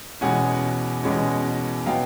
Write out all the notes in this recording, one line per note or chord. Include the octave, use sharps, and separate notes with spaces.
E2 B2 G#3 C#4 F#5 G#5
E2 B2 G#3 C#4
B2 F#3 B3 D#4 F5 G5